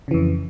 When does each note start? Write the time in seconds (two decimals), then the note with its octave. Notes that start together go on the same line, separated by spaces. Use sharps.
0.08 C#3
0.11 E3
0.14 F2